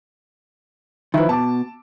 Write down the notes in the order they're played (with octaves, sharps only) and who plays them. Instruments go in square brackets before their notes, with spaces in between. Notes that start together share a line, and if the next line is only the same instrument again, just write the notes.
[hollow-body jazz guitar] D#3 F3 [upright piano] E4 B4
[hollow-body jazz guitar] B2 [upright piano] A5 D6